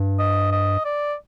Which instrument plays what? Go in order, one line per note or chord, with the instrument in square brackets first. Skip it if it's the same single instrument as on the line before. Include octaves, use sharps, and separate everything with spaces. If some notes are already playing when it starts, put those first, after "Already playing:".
Already playing: [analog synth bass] G2
[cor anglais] D#5
D#5
D5